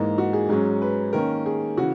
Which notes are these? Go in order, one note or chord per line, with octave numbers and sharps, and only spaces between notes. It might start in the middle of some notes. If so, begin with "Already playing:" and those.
Already playing: G#2 E3 A#3 D#4
F#4
G#4
G#2 F#3 C#4 G#4
B4
D#3 A#3 C#4 A#4
G#4
C#3 E3 F#4